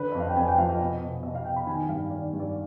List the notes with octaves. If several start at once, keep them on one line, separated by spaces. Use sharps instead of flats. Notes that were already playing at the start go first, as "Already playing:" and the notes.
Already playing: D3 B4
F2 D#5
F5
G5
F2 G#5
G5
F3 F5
D#5
B2
B2
B2 D#5
F5
B2 G5
B5
D#3 G#5
G2 F5
D#3 D5
G2
D5